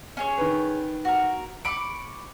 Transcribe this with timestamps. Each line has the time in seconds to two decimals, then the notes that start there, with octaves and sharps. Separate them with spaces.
0.17 C#4 G#4 C#5
0.38 D#3 B4
1.05 F#4 A#4
1.65 B5 C#6 D6 D7